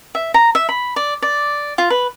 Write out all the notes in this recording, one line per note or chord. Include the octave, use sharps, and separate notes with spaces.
E5
A#5
E5
B5
D5
D5
F4
B4